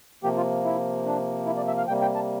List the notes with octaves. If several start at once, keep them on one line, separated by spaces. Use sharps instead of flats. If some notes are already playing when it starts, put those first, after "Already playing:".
C3 F3 A#3 G4
F4
E4
D4
E4
D5
E5
F5
C3 G3 A#3 G5
G5
A5